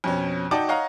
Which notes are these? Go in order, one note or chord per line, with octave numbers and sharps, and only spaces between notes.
F2 B2 C#4
D#4 F#4 D5 G5 A5 D6
C#5 D#5 F5 F#5 A#5